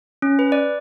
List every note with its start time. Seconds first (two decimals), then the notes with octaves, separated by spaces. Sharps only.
0.22 C#4
0.39 B4
0.52 D5